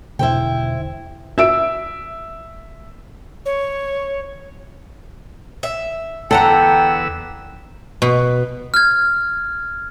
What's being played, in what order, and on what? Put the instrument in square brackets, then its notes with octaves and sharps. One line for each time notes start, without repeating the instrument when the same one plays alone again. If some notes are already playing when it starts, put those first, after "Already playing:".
[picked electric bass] E2 B2 D3 [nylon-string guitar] E4 C5 G5
[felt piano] E5 E6 D7
[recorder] C#5
[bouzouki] E5
[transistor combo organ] E2 B3 E6 [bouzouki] D3 F#5 A#5 [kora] A4 [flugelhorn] G5
[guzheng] B2
[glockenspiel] F6 G#6